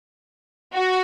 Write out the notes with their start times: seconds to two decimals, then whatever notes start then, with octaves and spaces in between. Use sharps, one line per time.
0.74 F#4